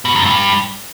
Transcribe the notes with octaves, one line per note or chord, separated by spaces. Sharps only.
B2
F#2
G2